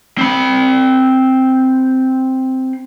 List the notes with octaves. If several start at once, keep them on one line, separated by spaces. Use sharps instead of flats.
C4 B5